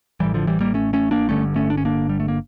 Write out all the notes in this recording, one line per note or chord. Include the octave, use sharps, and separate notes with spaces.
A1 A2 E3 G3
D3 F3
E3 G3
G3 A#3
A3 C#4
A3 C#4
A#3 D4
G1 G2 D3 A3 C#4
A3 C#4
D4
C#4
A#3 D4
G3
A3
A#3